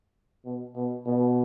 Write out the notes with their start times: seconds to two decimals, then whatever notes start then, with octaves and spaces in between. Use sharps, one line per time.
0.45 B2
0.76 B2
1.06 B2